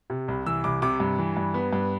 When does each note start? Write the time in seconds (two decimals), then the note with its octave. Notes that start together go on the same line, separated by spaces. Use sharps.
0.10 C3
0.28 C2
0.46 E3 E6
0.64 C2 D6
0.82 C3 D6
1.00 G2
1.18 E3
1.37 G2
1.54 B3
1.73 G2